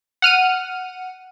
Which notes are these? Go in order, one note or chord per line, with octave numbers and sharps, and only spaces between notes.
F#5 F6 D#7